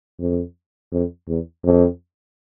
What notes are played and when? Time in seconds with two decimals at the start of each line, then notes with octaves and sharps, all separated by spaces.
0.20 F2
0.92 F2
1.28 E2
1.64 F2